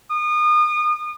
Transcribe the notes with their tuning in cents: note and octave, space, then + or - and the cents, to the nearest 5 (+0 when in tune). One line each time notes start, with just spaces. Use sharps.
D#6 -35